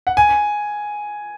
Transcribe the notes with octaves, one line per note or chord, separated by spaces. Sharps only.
F#5
G#5